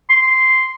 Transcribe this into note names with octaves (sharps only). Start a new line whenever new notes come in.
C6